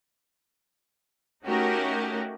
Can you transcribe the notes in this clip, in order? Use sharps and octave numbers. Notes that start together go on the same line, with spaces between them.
A3 C#4 D#4 F#4 G4 A#4